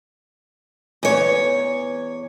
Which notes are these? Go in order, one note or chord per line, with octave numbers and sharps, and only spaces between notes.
E2 C#5